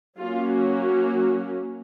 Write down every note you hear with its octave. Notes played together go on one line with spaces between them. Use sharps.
F#3 A#3 C#4 F4
F#4